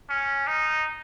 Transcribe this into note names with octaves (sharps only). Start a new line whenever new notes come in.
C#4
D#4